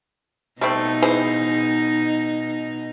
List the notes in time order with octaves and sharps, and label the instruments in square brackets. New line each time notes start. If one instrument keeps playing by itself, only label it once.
[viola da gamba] B2 D#4 [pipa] G3 A3 C4
[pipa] E3 G#4 C5